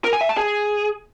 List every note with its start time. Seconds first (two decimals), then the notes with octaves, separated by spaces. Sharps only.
0.04 A#4
0.13 G#5
0.21 E5
0.29 A5
0.37 G#4